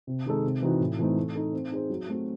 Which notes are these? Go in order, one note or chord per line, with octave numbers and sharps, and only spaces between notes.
C3
D#3 G#3 D#4 A4
C3
E3 C4 D#4 F#4
A2
E3 A3 C4 D#4
A3
D#4 A4
C4
D#4 G#4 C5
F#3
A3 C4 F#4